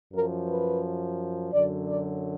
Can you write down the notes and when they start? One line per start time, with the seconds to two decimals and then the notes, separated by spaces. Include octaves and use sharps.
0.13 F#2 F3 A#4
0.47 B4
1.52 F#2 D3 F#3 D5
1.87 D5